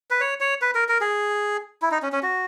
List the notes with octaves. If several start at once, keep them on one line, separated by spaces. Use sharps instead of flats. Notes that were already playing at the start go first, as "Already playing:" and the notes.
B4
C#5
C#5
B4
A#4
A#4
G#4
E4
D#4
C#4
C#4
F#4